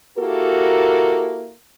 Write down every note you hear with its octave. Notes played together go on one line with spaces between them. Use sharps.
A#3 E4 F#4 G4 A4 A#4